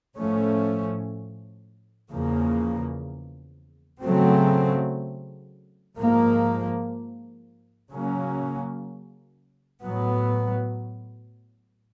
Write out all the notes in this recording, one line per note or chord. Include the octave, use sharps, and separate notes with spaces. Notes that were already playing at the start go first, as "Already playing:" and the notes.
A2 F3 A3 C#4
E2 C#3 F3 A#3
C#3 F#3 A3 C4
G#2 F3 A#3
C#3 F#3 A#3 C#4
A2 F#3 B3